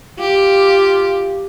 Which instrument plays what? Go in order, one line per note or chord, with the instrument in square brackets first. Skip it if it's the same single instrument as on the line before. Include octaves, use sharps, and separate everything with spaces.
[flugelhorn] F4 [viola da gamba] G4